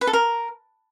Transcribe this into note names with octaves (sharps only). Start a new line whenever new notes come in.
B4
A4
A#4